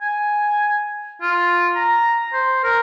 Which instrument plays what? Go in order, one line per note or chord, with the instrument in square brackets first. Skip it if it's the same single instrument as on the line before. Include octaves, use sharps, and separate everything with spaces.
[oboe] G#5
F4
A#5
C5
A#4